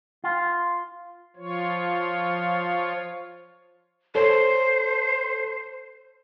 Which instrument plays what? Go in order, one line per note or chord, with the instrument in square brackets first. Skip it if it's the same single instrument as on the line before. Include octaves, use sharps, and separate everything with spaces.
[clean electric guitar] F4
[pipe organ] F3 F4 C#5
[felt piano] A4 C#5 [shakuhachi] C5